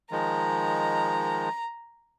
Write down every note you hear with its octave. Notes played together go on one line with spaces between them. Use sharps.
D#3 F3 G#3 A#5